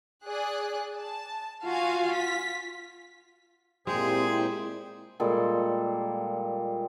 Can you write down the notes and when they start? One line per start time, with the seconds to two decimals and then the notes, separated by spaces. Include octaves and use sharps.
0.25 G#4 D5 F#6
0.97 A5
1.65 F4 F#4 F5 G#5
2.14 B6
3.87 A#2 G#3 C4 E4 G4 G#4 C5 G5
5.20 A#2 G3 G#3 A4